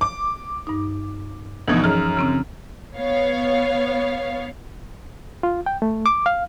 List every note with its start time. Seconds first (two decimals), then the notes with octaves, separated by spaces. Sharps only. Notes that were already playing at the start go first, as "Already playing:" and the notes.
0.01 D6
0.67 G2 D#4
1.68 D2 B2 E3 F3 D#4
1.84 F#2 G#4 F6
2.17 C#3 C4 C#4
2.96 B3 C#5 F5
5.43 F4
5.66 G5
5.82 A3
6.06 D6
6.26 F5